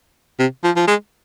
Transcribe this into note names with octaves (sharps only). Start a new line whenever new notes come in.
C3
F3
F3
G#3